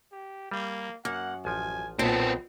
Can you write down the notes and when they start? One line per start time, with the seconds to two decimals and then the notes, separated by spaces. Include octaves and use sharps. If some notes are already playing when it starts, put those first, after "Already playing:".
0.12 G4
0.51 G3 A#3
1.05 F#2 A#3 F#5
1.45 A1 F3 G#5
1.99 B1 A#2 B3 C4 A5